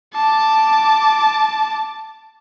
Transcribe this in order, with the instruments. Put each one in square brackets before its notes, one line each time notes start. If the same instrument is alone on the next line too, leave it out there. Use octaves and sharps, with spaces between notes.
[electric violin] A5 D6